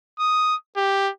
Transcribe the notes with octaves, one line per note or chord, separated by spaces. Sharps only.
D#6
G4